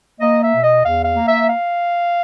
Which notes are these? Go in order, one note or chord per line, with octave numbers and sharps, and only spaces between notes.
A#3 D#5
E5
B2
D#5
E2 F5
F5
A#3
E5
F5